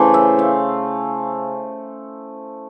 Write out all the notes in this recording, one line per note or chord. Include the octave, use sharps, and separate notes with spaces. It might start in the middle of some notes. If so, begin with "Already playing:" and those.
Already playing: C#3 E3 A3 C5
E5
F5